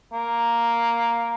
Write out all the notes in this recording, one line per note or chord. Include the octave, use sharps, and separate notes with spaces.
A#3